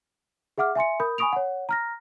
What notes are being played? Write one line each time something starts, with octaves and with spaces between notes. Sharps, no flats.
G#4 E5 F#5 D6 F6
E5 G#5 C6 C#7
A#4 B5 D#6 G6
G#5 B5 C#6 D#6 D7 F7
C#5 F#5
A#5 F6 A#6